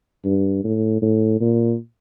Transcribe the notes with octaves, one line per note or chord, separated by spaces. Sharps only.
G2
A2
A2
A#2